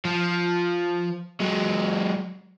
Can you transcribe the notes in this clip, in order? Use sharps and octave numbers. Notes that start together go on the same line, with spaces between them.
F3
F#3 G#3